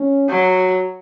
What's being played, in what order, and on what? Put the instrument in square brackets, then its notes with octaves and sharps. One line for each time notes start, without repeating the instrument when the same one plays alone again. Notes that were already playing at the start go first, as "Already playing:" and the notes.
Already playing: [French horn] C#4
[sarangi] F#3 [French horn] F#4